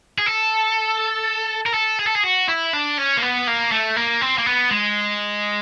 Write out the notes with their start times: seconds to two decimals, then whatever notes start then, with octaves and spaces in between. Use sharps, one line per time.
0.18 G#4
0.26 A4
1.67 A#4
1.74 A4
2.00 G#4
2.07 A4
2.15 G#4
2.24 F#4
2.48 E4
2.73 D4
2.98 C#4
3.17 A#3
3.23 B3
3.48 A#3
3.72 A3
3.97 A#3
4.22 C4
4.38 A#3
4.46 B3
4.71 G#3